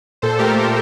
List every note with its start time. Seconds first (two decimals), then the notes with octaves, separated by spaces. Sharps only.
0.22 A#2 A4 C5
0.39 A3 G4 A#4
0.56 A3